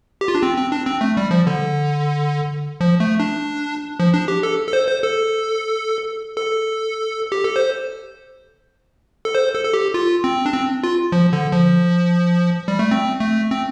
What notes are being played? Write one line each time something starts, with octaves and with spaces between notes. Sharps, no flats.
G4
F4
D4
C4
C4
D4
C4
A3
G3
F3
D3
F3
A3
D4
F3
D4
G4
A4
A4
C5
C5
A4
A4
G4
A4
C5
A4
C5
A4
A4
G4
F4
C4
D4
C4
F4
F3
D3
F3
G3
A3
C4
A3
C4